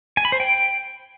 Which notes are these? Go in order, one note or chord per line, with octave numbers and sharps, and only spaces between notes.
G#5
B5
C5
G5